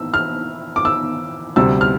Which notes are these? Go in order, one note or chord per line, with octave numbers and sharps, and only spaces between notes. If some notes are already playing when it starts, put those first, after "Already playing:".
Already playing: A2 E6
F6
D6
E6
D2 C3 G3 C4 E6
F6